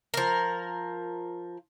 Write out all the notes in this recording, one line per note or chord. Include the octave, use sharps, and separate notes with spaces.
F3 A#4